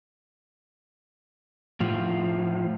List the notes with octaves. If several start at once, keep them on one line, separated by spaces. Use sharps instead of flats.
A2 F3